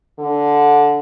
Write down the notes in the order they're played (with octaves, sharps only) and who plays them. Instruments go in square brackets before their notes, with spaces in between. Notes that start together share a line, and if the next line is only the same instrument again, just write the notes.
[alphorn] D3